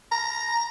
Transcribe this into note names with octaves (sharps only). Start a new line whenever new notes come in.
A#5